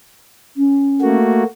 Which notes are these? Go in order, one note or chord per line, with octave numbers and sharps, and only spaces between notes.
C#4
A3 A#3 F#4